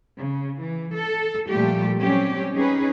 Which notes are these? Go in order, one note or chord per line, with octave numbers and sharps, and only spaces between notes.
C#3
E3
A4
A#2 F3 G3 A3 G4
F#3 G3 C4 C#4 G4
C#4 D#4 G#4 B4